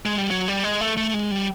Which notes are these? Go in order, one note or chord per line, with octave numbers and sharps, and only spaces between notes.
G#3
G3
F#3
G3
G#3
A3
A3
G#3
G3